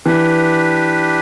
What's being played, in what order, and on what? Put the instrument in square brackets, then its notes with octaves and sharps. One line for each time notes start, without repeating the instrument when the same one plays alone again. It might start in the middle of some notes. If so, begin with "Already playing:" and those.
[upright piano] E3 [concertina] D4 G4 B4